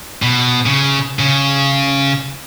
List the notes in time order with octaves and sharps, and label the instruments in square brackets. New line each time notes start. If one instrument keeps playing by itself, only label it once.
[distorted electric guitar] B2
C#3
C#3